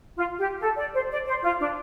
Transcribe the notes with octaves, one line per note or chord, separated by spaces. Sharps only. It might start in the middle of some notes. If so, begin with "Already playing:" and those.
F4
G4
A4
D5
C5
D5
C5
F4
D4